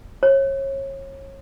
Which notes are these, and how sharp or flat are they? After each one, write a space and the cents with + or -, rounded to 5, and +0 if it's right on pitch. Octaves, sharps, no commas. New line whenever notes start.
C#5 -30